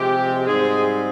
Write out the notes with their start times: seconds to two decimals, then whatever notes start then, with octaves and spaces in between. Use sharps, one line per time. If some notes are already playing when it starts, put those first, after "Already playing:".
Already playing: C3 F3 G#3 G4
0.46 G#2 G3 G#3 C4 G#4